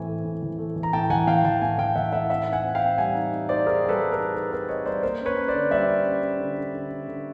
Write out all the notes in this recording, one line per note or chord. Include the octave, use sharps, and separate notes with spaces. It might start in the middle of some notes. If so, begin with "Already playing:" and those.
Already playing: A2 E3 C4 G#5
A3
A2
E3
A3
E3
A#5
A2 G5 A5
E3 F#5 G#5
E3 F5 G5
E3 G5 A5
A2 F#5 G#5
E3 F5 G5
E3 E5 F#5
A2 E5 F#5
C4 E5 F#5
D#4
F#5 G#5
C4
F5 G5
C4
G3 F#5 G#5
D#4
D#4
D#4 C5 D5
D#4 G#4 A#4
G3 A4 B4
G3
A#4 C5
D#4
D#4 A4 B4
C4 A#4 C5
C4 C#5 D#5
G3 C5 D5
A#3 A#4 C5
C#4
B4 C#5
C#4
C5 D5
D3
G3 D5 E5
C#4
C#4
C#4
D3
D3
D3
D3
D3